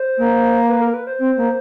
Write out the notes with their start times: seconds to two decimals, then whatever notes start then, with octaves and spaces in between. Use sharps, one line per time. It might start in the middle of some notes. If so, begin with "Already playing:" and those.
Already playing: C5
0.18 A#3
0.69 B4
0.82 A#4
0.94 B4
1.07 C5
1.19 C4
1.37 A#3